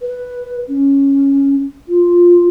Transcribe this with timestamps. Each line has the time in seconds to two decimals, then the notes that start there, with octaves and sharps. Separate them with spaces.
0.02 B4
0.68 C#4
1.88 F4